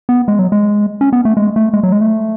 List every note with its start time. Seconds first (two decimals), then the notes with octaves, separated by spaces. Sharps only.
0.09 B3
0.28 G#3
0.39 F#3
0.52 G#3
1.01 C#4
1.13 B3
1.25 A3
1.37 G#3
1.56 A3
1.74 G#3
1.83 F#3
1.92 G#3
2.01 A3